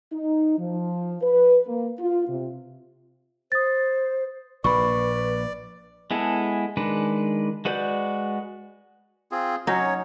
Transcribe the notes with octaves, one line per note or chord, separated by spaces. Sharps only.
D#4
F3
B4
A#3
F4
C3
C5 D#6 A6
A#1 A#2 B4 D5 B5 C#6
G#3 B3 E4 G#4 A4
D#3 G#3 D4 B4
G#3 F#4 B4 D5 G6
C4 F4 G#4
F#3 C#4 D#4 C#5